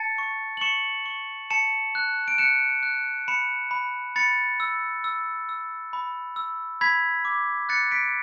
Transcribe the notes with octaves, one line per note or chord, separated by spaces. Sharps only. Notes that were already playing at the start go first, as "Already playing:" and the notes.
Already playing: A5 A6 C#7
C#6
F#7
C#6 C#7 E7
C#6
A5 C#7 E7
F#6
D7
F#6 C#7 E7
F#6
B5 C#7 E7
B5
B5 A6 C#7
E6
E6
E6
B5
E6
B5 G#6 B6
D6
F#6 A6 C#7
B6 D7